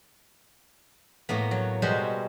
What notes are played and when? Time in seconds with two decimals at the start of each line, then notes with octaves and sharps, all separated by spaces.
1.29 A2 A#3 B3
1.51 F#3
1.82 B2 G3 G#3 C5 F#5